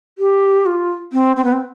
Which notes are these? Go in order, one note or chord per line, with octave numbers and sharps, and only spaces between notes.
G4
F4
C4
C4
B3
C4